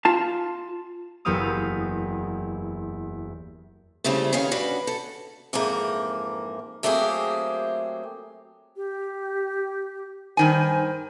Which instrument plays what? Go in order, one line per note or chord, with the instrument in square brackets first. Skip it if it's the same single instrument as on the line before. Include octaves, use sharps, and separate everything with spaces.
[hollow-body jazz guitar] F4 A5
[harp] F#1 E2 B3 G4 F5 D#6
[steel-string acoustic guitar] A#2 C#3 G3 A3 C4 E4
E2 D#3 B3 C#4 F5
D4 F#4 B4
A4
F2 G#2 E3 A#3
F#3 A3 A#3 C4 G4 G#4
[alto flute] G4
[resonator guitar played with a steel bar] G2 D#3 G#5 [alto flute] C5